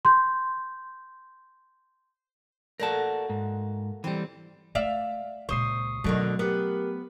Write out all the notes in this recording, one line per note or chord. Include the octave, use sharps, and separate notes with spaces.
C6 G6
A3 A#3 F#4 A#4 D5 A5
G#2
E3 G3 C4
A3 D5 E5 F5
C#2 A#2 C5 C#6 D#6 C7
B2 D3 D#3 F#3 A3
B3 G4 A#4